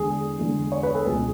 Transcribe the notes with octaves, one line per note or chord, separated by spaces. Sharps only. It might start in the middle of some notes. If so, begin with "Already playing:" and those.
Already playing: E2 D3 G#3 G#4
E2 D3 G#3
C#5
B4
A4
C#2 B2 F#3 G#4